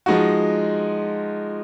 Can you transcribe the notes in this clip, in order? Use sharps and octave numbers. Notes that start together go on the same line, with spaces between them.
F3 G#3 D#4 F#4